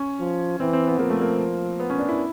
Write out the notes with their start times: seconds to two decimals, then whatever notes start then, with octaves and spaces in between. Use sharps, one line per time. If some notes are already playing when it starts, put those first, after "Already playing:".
Already playing: C#4
0.20 F3
0.60 E3 C4
0.73 C4
0.87 B3
0.99 F3 A#3
1.10 A3
1.21 A#3
1.80 B3
1.90 C#4
1.98 D4
2.08 E4